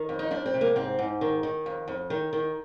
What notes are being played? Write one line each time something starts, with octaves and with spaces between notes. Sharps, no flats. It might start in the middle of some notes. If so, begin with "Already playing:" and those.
Already playing: D#3
F2
D#4
F2 D4
C4
C3
A#3
G#2 C4
G#2
D#3
D#3
F2
F2
D#3
D#3